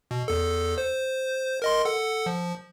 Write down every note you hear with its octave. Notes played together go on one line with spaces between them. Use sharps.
B2
E2 A4
C5
A#4 D#5 C6
A4 F#5
F3